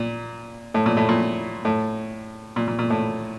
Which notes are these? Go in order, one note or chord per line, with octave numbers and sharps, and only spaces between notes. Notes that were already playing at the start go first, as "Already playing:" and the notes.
Already playing: A#2
A2
A#2
A2
A#2
A2
A#2
A#2
A#2
A2